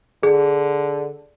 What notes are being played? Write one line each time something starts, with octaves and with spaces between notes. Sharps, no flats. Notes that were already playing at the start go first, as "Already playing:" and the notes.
D3 G#4